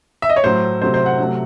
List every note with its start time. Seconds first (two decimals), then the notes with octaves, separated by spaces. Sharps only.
0.22 E5
0.29 D#5
0.36 C#5
0.44 A2 F#3 A3 C5
0.81 C3 F#3 A3 C5
0.94 C5
1.06 F#5
1.19 C3 F#3 A3